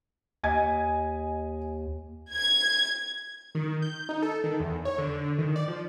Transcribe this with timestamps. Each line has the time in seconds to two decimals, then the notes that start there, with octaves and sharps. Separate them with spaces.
0.43 D#2 D#5 G#5 G#6
2.31 G#6
3.55 D#3
3.82 G6
4.09 D#4
4.22 A4
4.44 D#3
4.60 E2
4.85 C#5
4.98 D3
5.39 D#3
5.56 D5
5.68 F3